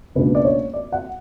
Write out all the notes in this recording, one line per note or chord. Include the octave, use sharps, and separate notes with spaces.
C#2 B2 A#3 D4 B4
D5
C#5
D5
F#5